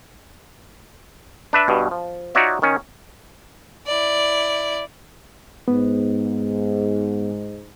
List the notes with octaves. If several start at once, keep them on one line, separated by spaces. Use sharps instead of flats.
D4 B4 E5
G2 B2
F3
D#4 F4 F#4 C#5 D5 E5
D#3 C#4
E4 D5
G#2 B3